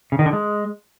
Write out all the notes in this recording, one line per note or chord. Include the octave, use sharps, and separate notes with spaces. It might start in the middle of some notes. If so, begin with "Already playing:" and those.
C#3
D#3
D3
G#3